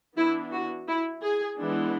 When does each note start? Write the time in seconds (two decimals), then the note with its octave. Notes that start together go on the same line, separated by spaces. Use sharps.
0.17 E3 B3 D4 E4
0.52 F#4
0.87 E4
1.22 G#4
1.57 E3 G#3 B3 D4